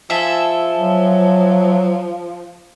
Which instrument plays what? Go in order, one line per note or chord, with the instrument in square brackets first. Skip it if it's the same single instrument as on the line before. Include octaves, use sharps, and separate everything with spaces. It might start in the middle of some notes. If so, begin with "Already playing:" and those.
[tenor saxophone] F3 [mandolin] G#4 A4 E5
[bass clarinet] F#3